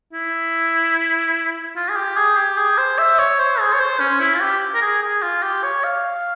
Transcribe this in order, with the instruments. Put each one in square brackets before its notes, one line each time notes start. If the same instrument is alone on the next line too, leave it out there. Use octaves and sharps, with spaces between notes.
[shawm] E4
F4
G#4
G4
G#4
G4
G#4
C5
E5
C#5
C5
G#4
C#5
C5
C#4
E4
F4
G4
A#4
G#4
G#4
F4
G4
C#5
F5